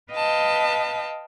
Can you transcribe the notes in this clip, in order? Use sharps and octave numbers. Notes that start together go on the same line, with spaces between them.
B4 D#5 F5 G5 A5